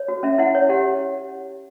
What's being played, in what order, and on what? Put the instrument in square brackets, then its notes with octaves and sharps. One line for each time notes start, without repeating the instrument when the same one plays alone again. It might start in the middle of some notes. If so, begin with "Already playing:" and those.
Already playing: [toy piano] C#5
F#4
C#4 E5
E4 F#5
C#5
G4 F#5